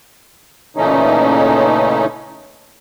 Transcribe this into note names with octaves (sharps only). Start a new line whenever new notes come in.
A#2 C#3 E3 A3 C#4 D#4